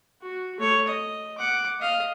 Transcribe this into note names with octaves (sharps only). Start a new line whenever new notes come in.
F#4
A3 C#5
D#5
F#5 D6
D#5 F5